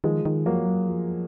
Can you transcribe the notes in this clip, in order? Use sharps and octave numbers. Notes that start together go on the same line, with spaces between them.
D#3 F3 G#3
D#3
F3 F#3 A#3
F#3
F3